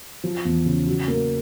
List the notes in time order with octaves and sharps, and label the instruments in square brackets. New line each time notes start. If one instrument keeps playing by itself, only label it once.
[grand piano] F3
E2
C#3
F#3
A#3